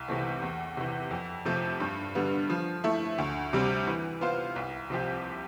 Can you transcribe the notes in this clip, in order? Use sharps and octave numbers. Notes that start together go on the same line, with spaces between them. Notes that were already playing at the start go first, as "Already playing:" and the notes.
Already playing: C2
C3 E3 A3 C4
E2
C3 E3
F2
C3 F3 A3
G2
D3 G3 B3
F3
A3 E4
D2
C3 G3 C4
E3
B3 F4 C5 F5
C2
C3 F3 C4 G4